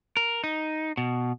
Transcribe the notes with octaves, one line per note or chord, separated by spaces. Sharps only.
A#4
D#4
B2